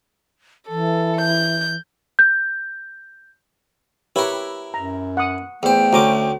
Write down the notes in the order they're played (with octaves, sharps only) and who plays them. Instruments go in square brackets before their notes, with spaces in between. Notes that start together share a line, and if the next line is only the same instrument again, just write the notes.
[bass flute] E3 [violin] A4
[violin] G6
[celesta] G6
[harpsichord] E4 A#4 [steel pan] G4 B4 C#5
[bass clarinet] F#2 [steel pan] A#5
[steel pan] F#5 D#6
[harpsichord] E2 C5 [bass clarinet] A3 [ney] G5
[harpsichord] D2 C#4 D6 [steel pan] F#4 C5 A#5